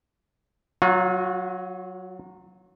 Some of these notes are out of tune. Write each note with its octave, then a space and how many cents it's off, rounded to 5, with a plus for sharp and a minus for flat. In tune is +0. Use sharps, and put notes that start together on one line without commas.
F#3 +0 F4 +45